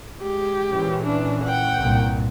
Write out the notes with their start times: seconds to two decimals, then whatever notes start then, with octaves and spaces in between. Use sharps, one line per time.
0.22 G#3 G4
0.71 A#2 E3 C#4
1.04 D4
1.44 F#5 G5
1.79 C2 G2 A#2